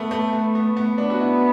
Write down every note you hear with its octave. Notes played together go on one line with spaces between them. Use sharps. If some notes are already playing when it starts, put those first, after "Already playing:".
Already playing: A3 B3
A3
A3 B3
B3
B3
B3 D4
F#4
E4